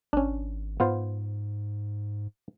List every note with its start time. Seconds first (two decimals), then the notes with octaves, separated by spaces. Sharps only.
0.13 G#1 C#4 D4
0.80 G#2 B3 F4 C5